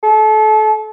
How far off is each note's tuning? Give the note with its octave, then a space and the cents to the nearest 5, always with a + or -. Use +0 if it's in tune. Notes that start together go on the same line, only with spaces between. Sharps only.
A4 -30